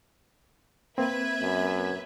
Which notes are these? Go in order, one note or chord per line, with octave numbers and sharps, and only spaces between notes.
A#3 C4 B4 E5 G#6
F#2